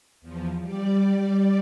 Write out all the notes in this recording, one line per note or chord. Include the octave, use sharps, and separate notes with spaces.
E2 F3
G3 D5